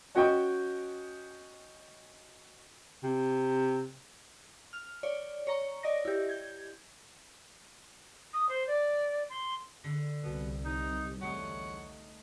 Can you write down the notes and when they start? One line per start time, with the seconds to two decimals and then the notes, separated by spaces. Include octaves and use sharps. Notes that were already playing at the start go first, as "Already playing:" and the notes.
0.15 C#4 F#4 D#5 G5 C#6
3.03 C3
4.73 F6
5.03 C#5 D5
5.47 C#5 A#5 C#6
5.83 D5 D#5 A#6
6.05 E4 G4
6.29 G6 G#6
8.33 D#6
8.49 C5
8.67 D5
9.29 C6
9.84 D3
10.23 C2 B2 B3
10.65 D#4
11.21 E2 A3 D#4 C#5 F#5